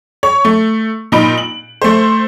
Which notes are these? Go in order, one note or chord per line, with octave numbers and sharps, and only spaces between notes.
C#5
A3
A#2 D#4 B5 D7
F#7
A3 C5